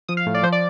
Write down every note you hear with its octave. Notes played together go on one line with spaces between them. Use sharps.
F3 D#6
F5
A2
D5
F3 C5
D5